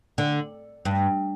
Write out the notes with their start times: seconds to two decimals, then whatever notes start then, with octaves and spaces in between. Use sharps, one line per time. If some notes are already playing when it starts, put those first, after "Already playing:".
0.18 D3
0.85 G2